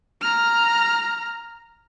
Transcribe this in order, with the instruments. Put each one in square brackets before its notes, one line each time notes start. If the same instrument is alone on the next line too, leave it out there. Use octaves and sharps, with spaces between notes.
[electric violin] A#5 F6